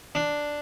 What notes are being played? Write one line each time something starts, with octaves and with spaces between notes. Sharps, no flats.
D4